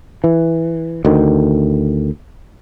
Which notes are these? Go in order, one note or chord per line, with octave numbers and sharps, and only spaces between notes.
E3
D2 D#3